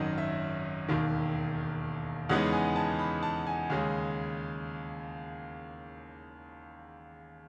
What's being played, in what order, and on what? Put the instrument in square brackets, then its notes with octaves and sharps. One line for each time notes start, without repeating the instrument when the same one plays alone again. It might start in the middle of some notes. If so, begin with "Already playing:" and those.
Already playing: [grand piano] G#1 F#2 D#3 F#3 C#4 D#5
E5
E1 D#2 D#3
E2 C#3 G#3 B3 D#4 F#5
G#5
A5
B5
A5
G#5
D#2 C#3 G#3